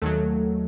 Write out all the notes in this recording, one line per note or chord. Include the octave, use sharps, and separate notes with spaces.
D#2 D#3 F#3 A3 A4